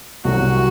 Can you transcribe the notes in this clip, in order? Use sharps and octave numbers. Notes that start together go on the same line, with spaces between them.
C2 C3 F#3 F#4